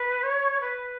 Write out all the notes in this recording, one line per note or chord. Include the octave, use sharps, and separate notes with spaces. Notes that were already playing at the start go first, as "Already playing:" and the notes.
Already playing: B4
C#5
B4